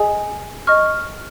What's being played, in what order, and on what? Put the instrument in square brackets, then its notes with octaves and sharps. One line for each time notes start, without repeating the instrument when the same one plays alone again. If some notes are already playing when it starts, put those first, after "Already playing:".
Already playing: [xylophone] G#4 D#5 G#5
D#5 C#6 F6